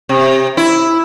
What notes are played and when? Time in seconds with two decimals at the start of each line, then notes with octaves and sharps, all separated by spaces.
0.09 C3
0.57 E4